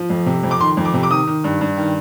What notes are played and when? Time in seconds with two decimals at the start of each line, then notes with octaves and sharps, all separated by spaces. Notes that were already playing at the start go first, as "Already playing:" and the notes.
Already playing: F3
0.10 F2
0.26 C3
0.43 F2
0.51 D6
0.61 D#3 C6
0.77 F2
0.85 D6
0.94 C3
1.03 D6
1.10 D#3 D#6
1.27 D#3
1.44 G2
1.61 G2
1.77 D#3